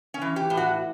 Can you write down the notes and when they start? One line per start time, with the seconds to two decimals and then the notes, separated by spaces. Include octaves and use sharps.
0.14 C#4
0.22 E3
0.36 G4
0.50 A2
0.57 F#4